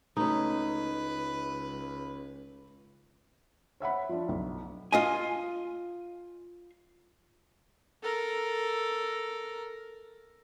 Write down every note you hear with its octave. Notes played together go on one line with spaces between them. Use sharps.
C#2 A3 C#4 D#4 B4
C#5 E5 F#5 B5
F3 D4
B1
F4 D#5 G#5
A4 A#4